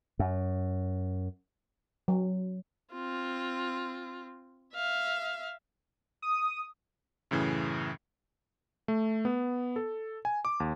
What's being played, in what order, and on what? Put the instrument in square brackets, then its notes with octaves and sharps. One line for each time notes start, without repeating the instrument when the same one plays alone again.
[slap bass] F#2
[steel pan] F#3
[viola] C4 F4
E5 F5
[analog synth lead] D#6
[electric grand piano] F#2 A2 C#3 E3
A3
B3
A4
G#5
D6
D#2